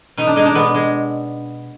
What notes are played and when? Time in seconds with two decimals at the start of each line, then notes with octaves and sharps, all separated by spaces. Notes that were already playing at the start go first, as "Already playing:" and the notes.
0.17 B2 D#4
0.27 D4
0.36 G#3 D#4
0.45 D4
0.55 B2 B3
0.74 G#3